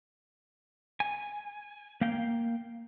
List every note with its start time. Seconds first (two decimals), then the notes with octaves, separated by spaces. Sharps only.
1.00 G#5
2.01 A#3 F5 G5